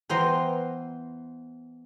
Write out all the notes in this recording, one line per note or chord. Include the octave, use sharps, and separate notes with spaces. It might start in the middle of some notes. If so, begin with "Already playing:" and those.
E3 B3 C5 G5 A#5 C6